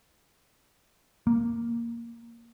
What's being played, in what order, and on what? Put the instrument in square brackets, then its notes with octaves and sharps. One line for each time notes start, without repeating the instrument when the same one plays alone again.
[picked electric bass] A#3